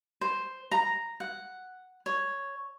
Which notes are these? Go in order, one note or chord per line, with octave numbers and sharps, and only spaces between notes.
C5
A#5
F#5
C#5